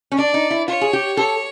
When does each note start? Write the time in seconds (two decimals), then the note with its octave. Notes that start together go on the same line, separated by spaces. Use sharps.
0.12 C#4
0.17 D4 D5
0.34 D#4
0.51 E4
0.68 F4 C#5
0.81 G#4
0.93 G4
1.17 A4 C#5